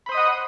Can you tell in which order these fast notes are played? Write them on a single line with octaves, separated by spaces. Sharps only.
B5 C5 D#6 D#5 F#5